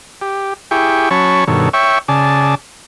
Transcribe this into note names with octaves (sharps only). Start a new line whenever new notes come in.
G4
E4 G4 G#4 G5 C#6
F#3 C#4 C#5 A5 B5 C#6
G2 B2 D#3 A4 C#5
C#5 E5 G5 C#6
C#3 G#4 D5 A5